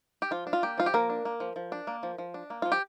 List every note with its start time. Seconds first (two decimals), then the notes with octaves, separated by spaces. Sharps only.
0.22 G4
0.31 F3 F4
0.47 D4
0.53 F4
0.63 A#3 G4
0.78 F3 F4
0.86 G4
0.94 F3 A#3 A#4
1.10 D4
1.25 A#3
1.40 F3
1.56 F3
1.72 D4
1.87 A#3
2.03 F3
2.18 F3
2.34 D4
2.50 A#3
2.62 F3 F4
2.72 G4